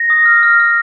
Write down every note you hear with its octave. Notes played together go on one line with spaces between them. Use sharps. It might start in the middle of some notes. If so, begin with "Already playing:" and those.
Already playing: A#6
D#6
F6
F6
F6